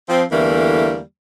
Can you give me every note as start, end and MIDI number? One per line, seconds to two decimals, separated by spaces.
0.09 0.24 53
0.09 0.24 60
0.32 0.99 40
0.32 0.99 50
0.32 0.99 52
0.32 0.99 55
0.32 0.99 57
0.32 0.99 58